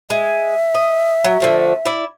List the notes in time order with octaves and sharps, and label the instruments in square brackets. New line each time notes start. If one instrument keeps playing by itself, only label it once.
[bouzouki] G#3 [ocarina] E5
[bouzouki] D#5
F#3
D3 F3 A3
E4 D5